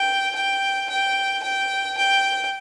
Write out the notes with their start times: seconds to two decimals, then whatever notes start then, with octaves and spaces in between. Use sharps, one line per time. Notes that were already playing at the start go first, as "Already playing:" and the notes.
Already playing: G5
0.35 G5
0.90 G5
1.43 G5
1.97 G5